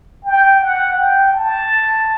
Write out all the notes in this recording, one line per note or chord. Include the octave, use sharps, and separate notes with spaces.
G5
F#5
G5
A5